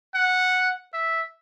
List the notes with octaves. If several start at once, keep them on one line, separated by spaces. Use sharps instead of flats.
F#5
E5